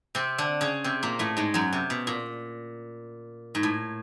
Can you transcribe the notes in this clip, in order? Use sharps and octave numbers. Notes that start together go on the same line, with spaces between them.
C3 C4
D3 D4
C#3 C#4
C3 C4
A#2 A#3
A2 A3
G#2 G#3
F#2 F#3
C3
B2
A#2
G#2
A2